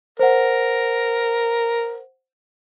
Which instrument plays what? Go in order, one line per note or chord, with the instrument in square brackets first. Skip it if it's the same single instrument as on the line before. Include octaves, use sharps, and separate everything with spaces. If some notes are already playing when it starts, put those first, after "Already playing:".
[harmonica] A#4 [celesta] C5 F#5